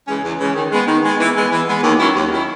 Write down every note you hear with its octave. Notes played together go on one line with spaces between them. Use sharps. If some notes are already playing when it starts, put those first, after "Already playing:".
C#3 E3 G#3 C#4
E2
C#3 E3 G#3 C#4
D#3
G#3 B3
D#3
G#3 B3
E3
G#3 B3
E3
G#3 B3
D#2
D#3 F#3 C#4 E4
D#2
D#3 F#3 C#4 E4